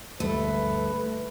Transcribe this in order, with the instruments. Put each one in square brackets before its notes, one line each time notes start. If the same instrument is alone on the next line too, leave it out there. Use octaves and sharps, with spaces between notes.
[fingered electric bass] D2 G2 [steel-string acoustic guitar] A3 [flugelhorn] B4